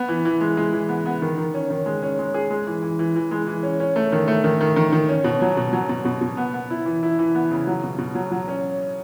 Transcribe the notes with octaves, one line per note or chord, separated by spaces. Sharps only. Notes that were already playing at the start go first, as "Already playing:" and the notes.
Already playing: B3
E3
E3
G#3
G#3
E3
B3
B3
D#3
D#3
C#4
D#3
G#3
C#4
G#3
G#4
G#3
E3
E3
E3
E3
G#3
E3
C#4
C#4
A3
D#3
A3
D#3
D#3
D#3
D#3
C#4
B2
F#3
B2
F#3
B2
B2
B2
B3
B3
E4
E3
E4
E3
B3
C#3
F#3
B2
B2
F#3
F#3
C#4